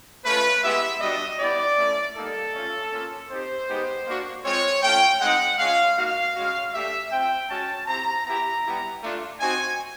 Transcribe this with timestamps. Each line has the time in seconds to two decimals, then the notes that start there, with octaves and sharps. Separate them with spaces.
0.24 A3 C#4 F4 B4
0.62 G#3 B3 E4 G4 E5
1.01 G3 B3 D4 F#4 D#5
1.39 B3 E4 G4 D5
1.78 A3 C#4 E4
2.16 G3 A#3 D#4 A4
2.53 A3 C#4 F4
2.92 A#3 C#4 F4
3.30 C4 D#4 G4 C5
3.68 G#3 B3 D#4 G4
4.06 A#3 D4 F#4
4.45 G#3 C4 F4 C#5
4.83 A3 C#4 F4 G5
5.20 G#3 C4 D#4 F#5
5.59 G#3 C#4 F4 F5
5.97 A#3 D#4 F#4 F5
6.35 G#3 C#4 F#4
6.73 A3 D4 G4 E5
7.11 C4 F4 G5
7.49 G#3 C#4 F#4 A5
7.88 C4 E4 G4 A#5
8.25 B3 E4 G4 A#5
8.64 G3 B3 E4 G4
9.02 A3 D4 F4
9.40 C4 D#4 F#4 G#5